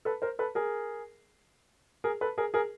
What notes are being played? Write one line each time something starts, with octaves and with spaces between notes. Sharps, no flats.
A4 B4
A#4 C5
A4 B4
G#4 A#4
G#4 A#4
A4 B4
G#4 A#4
G#4 A#4